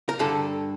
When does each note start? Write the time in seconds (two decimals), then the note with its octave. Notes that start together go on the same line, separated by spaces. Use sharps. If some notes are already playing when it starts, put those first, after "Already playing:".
0.09 A#4
0.19 G2 D3 A4